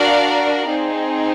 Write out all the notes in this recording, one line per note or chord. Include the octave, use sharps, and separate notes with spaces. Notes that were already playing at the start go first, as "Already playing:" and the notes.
Already playing: D4 F#4 A#4 D5 F5
C4 D#4 G#4